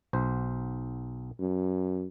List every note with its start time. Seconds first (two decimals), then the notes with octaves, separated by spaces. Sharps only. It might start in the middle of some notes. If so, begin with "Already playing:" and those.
0.13 B1 C5
1.39 F#2